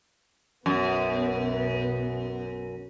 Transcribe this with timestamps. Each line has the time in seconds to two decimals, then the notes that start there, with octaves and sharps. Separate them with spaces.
0.66 B1 F#2 B3